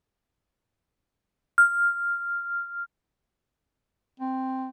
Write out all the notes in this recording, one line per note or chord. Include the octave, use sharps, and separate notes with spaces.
F6
C4